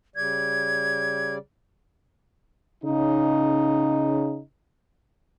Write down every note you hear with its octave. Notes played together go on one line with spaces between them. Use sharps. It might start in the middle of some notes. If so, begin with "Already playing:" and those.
C#3 G3 D5 G#6
C#3 D#4